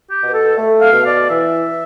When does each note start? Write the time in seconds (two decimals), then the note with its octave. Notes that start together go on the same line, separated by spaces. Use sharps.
0.09 G4
0.20 B2
0.27 B4
0.33 A4
0.56 A3
0.80 F5
0.92 B2
1.05 D5
1.29 E3 E5